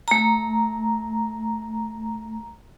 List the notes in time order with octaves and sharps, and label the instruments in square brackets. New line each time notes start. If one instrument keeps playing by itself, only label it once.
[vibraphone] A3 A#5